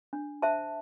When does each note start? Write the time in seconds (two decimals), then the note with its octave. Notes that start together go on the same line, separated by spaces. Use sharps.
0.13 D4
0.42 C5 E5 A5